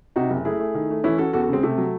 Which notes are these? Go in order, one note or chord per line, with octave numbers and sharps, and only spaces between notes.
C3 D#4 F#4
F#1
A3 E4 G#4
A3
D#3
A3
E3 C#4 E4
C#4 F#4 A4
E2 F#4 A4
F#4 A4
C#3 G#3 C4
C3 A3
F#3